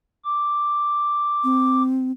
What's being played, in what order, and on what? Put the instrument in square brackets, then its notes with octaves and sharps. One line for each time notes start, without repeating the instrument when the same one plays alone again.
[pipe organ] D6
[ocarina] C4